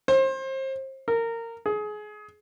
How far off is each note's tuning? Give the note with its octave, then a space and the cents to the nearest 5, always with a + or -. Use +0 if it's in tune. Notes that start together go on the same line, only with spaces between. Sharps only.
C5 +30
A#4 -20
G#4 +25